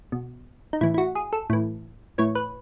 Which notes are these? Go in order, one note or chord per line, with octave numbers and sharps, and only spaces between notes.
B2
D#4
A2 E3 E4
E4
F#4
G#4
A4
A2 E3
A2 E3 C#5
B4